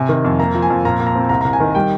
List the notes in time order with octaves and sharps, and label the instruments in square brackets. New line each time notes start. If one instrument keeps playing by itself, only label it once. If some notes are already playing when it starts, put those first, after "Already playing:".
Already playing: [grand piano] C3 G#5
D#3
F2
A#3 A#5
F3
G#5
F2
A#2 A#5
A#2
A#5
C4
C2 A#5
C2 A#5
G#5
D#3
G3 G5